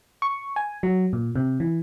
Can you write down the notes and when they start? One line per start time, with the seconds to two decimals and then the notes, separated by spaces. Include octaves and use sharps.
0.22 C#6
0.56 G#5
0.83 F#3
1.13 A#2
1.36 C3
1.60 E3